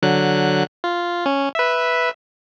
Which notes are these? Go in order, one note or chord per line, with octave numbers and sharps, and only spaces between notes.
D3 F#3 F#6
F4
C#4
B4 E5